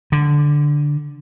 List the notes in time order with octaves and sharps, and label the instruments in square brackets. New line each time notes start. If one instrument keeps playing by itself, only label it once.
[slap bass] D3